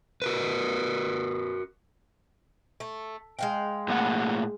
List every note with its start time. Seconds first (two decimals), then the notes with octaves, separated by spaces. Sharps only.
0.22 F#4 A#4 B4
2.80 A3
3.39 G#3 F5 G5
3.88 A2 A#3 F#5